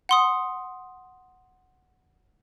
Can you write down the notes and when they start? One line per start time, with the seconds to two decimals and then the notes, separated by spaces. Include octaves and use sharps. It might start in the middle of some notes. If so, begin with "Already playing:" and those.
0.09 F#5 C6 D#6